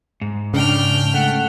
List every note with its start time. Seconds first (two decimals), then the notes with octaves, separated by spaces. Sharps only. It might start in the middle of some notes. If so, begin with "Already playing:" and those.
0.21 G#2
0.54 C#3 D4 G5 F6
1.14 A3 F#5